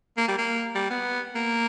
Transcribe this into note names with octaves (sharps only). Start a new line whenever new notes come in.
A#3
G3
A#3
G3
B3
A#3